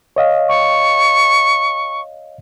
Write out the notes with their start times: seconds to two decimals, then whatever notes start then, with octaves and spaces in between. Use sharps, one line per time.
0.16 C#5 D#5 F5
0.49 C#6